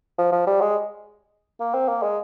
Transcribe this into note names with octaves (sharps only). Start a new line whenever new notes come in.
F3
F3
G3
G#3
A#3
C4
A#3
G#3